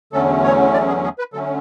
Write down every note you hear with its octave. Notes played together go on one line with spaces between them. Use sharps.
E2 D3 F#3 A3 C#4 A4
C#5
D5
G#4
G#4
B4
D3 F#3 A3 C#4 A4